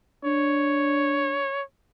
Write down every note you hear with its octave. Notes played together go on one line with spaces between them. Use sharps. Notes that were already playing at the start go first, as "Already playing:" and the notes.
D4 C#5